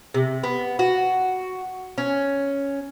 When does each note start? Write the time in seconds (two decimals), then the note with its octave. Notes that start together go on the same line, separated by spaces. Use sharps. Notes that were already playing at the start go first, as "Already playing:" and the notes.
0.14 C3
0.44 B3
0.79 F#4
1.98 C#4